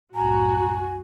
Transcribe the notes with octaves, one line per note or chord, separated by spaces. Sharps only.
C2 F#2 A2 F#4 G#5 A#5